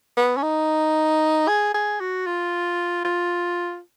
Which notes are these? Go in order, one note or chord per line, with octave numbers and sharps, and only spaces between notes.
B3
C#4
D#4
G#4
G#4
F#4
F4
F4